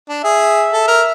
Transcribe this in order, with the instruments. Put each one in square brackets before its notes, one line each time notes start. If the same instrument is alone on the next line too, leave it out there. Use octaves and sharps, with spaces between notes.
[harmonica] D4
[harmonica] G#4 [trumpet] E5
[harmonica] A4
A#4